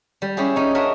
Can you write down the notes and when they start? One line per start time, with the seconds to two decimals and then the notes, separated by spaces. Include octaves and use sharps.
0.22 G3
0.37 C#4 E4 G4 G#4
0.56 C#4 D#4
0.75 D4 F#4 A#4 C#5 D#5 E5